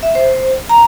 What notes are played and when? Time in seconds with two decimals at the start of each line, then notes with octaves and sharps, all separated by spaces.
0.03 E5
0.15 C5
0.69 A#5